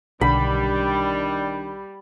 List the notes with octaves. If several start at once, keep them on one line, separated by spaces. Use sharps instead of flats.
B1 D3 D#3 G3 D4 B5